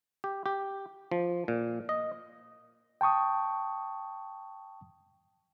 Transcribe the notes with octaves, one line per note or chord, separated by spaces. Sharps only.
G4
G4
F3
A#2
D#5
G5 A5 C#6 D#6